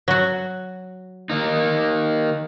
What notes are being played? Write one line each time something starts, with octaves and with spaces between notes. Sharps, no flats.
F#3 F#4
D#3 A#3 D#4